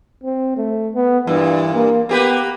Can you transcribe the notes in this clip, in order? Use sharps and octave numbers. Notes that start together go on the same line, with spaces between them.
C4
A3
B3
G2 A#2 E3
A#3
A#3 B3 G4 B4